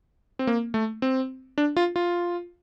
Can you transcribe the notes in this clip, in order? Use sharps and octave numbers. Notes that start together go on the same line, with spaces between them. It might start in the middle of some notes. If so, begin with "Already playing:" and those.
C4
A#3
A3
C4
D4
F4
F4